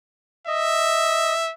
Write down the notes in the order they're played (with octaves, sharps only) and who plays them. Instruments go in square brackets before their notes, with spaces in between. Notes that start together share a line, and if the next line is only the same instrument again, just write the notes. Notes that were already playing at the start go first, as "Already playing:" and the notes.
[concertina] D#5 [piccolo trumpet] E5